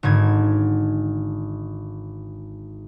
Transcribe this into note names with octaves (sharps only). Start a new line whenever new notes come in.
G#1 G#2 D3 G#6